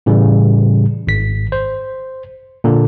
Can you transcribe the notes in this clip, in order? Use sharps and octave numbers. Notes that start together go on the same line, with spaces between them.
A2 C#3 E3 G3
G#1 B6
C5
A#2 D3